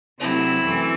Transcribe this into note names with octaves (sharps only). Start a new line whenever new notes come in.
C3 F#3 A3 C4 E4
F#2 E3 A3 C4